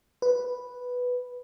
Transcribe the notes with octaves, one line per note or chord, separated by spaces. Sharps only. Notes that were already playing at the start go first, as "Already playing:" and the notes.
B4